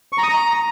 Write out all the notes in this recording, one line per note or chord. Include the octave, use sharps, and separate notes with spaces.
C#6
A#5
D#6
A#5